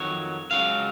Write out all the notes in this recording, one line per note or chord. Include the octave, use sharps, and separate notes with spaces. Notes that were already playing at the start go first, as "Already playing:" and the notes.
Already playing: F2 D#3 F#3 C#5
C#2 C#3 F#3 F5